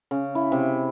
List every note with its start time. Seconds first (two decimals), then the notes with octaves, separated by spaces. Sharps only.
0.11 C#3
0.35 E4
0.52 C3